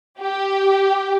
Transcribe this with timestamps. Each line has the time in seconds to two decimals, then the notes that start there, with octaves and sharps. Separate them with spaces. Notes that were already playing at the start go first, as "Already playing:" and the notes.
0.19 G4